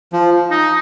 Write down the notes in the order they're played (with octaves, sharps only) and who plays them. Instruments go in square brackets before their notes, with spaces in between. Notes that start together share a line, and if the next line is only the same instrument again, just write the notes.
[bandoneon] F3
[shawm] D#4